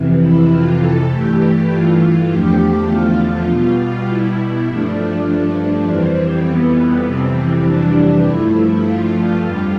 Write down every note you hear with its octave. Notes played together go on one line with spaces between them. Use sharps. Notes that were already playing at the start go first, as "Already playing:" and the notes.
Already playing: F2 C3 E3
E4
F4
A4
G2 E3 A3 G4
F4
E2 D3 F3 A3 G4
F4
B2 G3
E4
G2 F3 A3 D4
F2 E3 G3 C4
B3
F2 C3 E3 G3 C4
D4
G2 F3 A3 E4
F4
F2 D3 G3 F4